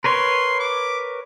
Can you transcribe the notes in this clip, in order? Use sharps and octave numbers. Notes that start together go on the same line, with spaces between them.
A#4 B4 C#5 C6
D6